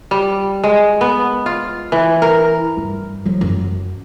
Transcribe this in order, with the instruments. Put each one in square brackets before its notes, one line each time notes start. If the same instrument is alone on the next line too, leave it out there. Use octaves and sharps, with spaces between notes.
[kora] G3
G#3
B3
F4
E3
A#4
[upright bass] G2
F3 F#3
F#2